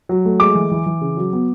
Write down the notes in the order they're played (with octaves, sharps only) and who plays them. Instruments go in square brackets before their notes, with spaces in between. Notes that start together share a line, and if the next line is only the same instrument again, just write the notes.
[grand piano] F#3
A3
G#3 D6
E3
E3
E3
C#3
F#3
B3